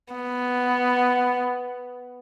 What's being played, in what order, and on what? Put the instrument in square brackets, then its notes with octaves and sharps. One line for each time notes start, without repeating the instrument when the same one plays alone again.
[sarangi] B3